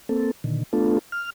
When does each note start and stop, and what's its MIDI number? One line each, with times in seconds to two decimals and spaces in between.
0.09 0.31 58
0.09 0.31 60
0.09 0.31 69
0.44 0.63 46
0.44 0.63 50
0.44 0.63 51
0.73 0.99 57
0.73 0.99 59
0.73 0.99 62
0.73 0.99 65
0.73 0.99 69
1.12 1.30 89